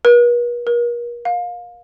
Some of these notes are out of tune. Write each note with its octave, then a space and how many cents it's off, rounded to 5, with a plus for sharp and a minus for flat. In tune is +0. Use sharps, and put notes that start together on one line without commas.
B4 -45
A#4 +40
F5 +25